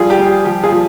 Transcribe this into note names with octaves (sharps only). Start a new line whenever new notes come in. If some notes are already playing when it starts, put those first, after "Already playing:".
Already playing: F3 G3 F4 G#4
G4
G3
G4
F3 G4
F4 G#4
F3